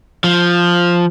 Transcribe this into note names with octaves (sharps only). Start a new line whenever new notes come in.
F3